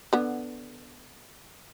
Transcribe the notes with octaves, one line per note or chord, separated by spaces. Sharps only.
D3 B3